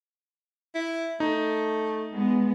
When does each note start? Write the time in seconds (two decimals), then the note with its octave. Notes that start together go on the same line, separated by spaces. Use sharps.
0.75 E4
1.20 A3 D#4
2.10 G#3 B3